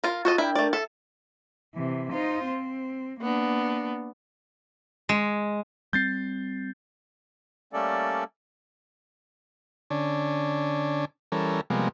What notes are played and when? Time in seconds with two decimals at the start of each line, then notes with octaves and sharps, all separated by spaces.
0.04 F4 A#4
0.25 F4 F#4 A4 D#5
0.38 D4 E4 A#4 G5
0.55 A3 D5
0.73 A4 E5
1.74 C3 E3
2.12 D#4 F4 C5
2.45 C4
3.20 A#3 B3 D4
5.09 G#3
5.93 G3 C4 G6 A6 C7
7.73 G3 A3 A#3 C#4 A4 D5
9.90 D3 C#4 D4
11.32 E3 G3 C#4 A4 A#4
11.70 C3 F3 G3 G#3 A#3 B3